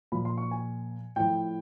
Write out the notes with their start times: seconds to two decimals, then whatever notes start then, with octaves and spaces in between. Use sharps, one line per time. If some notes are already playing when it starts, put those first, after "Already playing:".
0.12 A#2 F3 B5
0.25 C6
0.38 C#6
0.51 G#5
1.16 A2 F3 G5